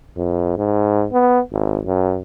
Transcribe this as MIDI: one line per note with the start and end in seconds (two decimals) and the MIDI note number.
0.17 0.57 41
0.57 1.06 44
1.12 1.40 59
1.52 1.80 32
1.85 2.20 42